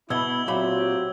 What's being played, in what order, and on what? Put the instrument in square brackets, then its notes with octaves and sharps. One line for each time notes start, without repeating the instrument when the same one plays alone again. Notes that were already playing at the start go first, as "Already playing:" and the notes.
[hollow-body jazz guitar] B2 B3 [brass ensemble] E4 [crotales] E6 G#6 G7
[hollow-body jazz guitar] A#2 E5 B5 [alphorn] F#3 [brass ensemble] C4 F4 G4